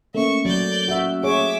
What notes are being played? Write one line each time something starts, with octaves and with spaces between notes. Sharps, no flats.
A3 A#3 C#4 E5 C#6
F#3 D5 G6
F#4 E5
G#4 C#5 E5 D6